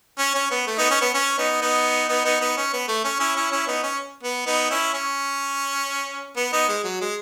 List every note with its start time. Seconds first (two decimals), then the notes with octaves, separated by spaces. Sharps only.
0.18 C#4
0.35 C#4
0.51 B3
0.67 A3
0.78 B3 D#4
0.91 C#4
1.01 B3
1.15 C#4
1.38 B3 D#4
1.62 B3 D#4
2.08 B3 D#4
2.25 B3 D#4
2.40 B3 D#4
2.57 C#4
2.73 B3
2.88 A3
3.04 C#4
3.20 C#4 E4
3.36 C#4 E4
3.51 C#4 E4
3.67 B3 D#4
3.83 C#4
4.23 B3
4.46 B3 D#4
4.70 C#4 E4
4.94 C#4
6.36 B3
6.53 B3 D#4
6.68 G#3
6.84 F#3
7.01 G#3